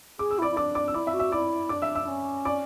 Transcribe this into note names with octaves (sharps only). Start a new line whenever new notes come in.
G#4 D6
E6
E4
D5 D6
E4
D4 D5 D6
D5 D6
E6
E4 D5 D6
E5 E6
F#4
E5 E6
E4 D5 D6
D4 D5 D6
E5 E6
E5 E6
D4
C#4
D5 D6